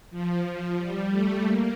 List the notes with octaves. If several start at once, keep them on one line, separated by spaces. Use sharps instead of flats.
F3
G3
A3
A#3